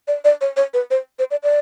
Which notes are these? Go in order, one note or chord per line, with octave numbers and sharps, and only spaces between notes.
D5
D5
C#5
C#5
B4
C5
C5
D5
D5